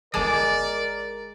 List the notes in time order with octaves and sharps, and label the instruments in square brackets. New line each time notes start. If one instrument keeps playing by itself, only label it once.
[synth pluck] G1 G#5 D6 [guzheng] G#3 [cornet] A#4 [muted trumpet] D5